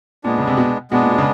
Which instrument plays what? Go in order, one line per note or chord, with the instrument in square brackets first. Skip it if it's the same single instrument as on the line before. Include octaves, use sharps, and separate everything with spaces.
[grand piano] A#2 [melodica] G#3 B3 D4
[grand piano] C#3
C3
B2
[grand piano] B2 [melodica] G#3 B3 D4
[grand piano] A#2
B2
C#3